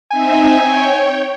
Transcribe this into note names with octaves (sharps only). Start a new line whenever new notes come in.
C4 D#4 E5 G#5
C#5 G5